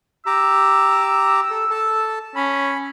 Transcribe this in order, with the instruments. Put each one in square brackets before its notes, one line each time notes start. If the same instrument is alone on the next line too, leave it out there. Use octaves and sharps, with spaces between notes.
[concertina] G4 A#5 D6 [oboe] E6
[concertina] A4
A4 A5
[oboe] C#4 [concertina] B5